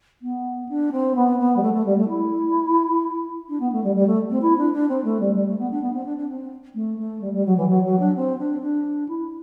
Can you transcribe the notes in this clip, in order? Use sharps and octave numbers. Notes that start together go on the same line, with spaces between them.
B3
D4
C4
B3
B3
G3
A3
A3
G3
A3
E4
D4
B3
A3
G3
G3
A3
C4
E4
D4
D4
C4
A3
G3
G3
A3
B3
D4
B3
C4
D4
D4
C4
A3
A3
G3
G3
F#3
E3
F#3
F#3
D4
C4
D4
D4
E4